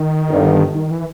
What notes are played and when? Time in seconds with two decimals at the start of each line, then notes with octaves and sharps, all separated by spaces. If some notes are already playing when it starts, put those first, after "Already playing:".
Already playing: D#3
0.27 G1 G2 D3
0.75 D#3
0.91 E3